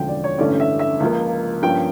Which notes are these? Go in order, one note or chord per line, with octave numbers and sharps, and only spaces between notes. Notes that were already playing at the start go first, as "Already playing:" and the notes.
Already playing: E1 D2 D3 F3 C#4 G5
D5
C#5
A1 G2 D3 A3 C#4 D5
E5
E5
C#2 C#3 F3 A#3
G2 F3 A#3 C#4 G5